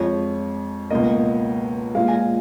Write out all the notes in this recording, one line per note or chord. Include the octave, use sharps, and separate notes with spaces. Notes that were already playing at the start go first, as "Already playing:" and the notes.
Already playing: F2 F3 G#3 C#5
C#2 B2 A#3 D#5
A#2 G#3 F5
G#5